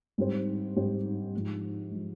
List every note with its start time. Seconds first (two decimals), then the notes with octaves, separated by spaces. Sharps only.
0.18 G#2 G3 C4 G4 C5
0.76 G#2 G3 C4 G4 C5
1.33 G#2 F3 G#3
1.91 F3 G#3